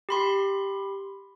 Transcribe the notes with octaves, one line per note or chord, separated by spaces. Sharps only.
G4 B5 C6